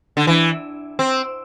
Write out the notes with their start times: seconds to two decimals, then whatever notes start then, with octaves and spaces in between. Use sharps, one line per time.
0.17 D3
0.27 E3
0.99 C4